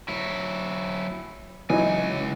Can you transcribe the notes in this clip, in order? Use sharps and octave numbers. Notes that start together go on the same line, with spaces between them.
F#3 E4
C#2 E3 F#3 D#4 G#5